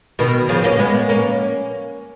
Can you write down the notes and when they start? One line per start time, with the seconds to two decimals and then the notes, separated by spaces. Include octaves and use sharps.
0.19 B2 D#3
0.49 C#3 F3
0.64 A#3 C#4
0.79 G#3 B3
1.09 A#3 C#4